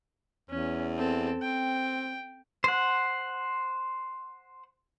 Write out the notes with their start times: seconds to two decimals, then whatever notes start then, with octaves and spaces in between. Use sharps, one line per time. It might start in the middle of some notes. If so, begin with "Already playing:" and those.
0.50 E2 C#4
0.97 C4 A4
1.42 C4 G5
2.64 C5 F#5